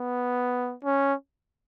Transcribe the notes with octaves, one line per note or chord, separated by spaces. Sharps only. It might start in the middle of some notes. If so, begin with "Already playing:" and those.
Already playing: B3
C#4